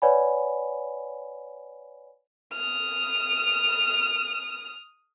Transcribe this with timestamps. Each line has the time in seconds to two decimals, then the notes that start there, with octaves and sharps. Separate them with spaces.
0.02 B4 C#5 D5 F#5 G#5 B5
2.53 D#6 F6